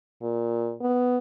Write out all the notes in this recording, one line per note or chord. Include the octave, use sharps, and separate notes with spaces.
A#2
B3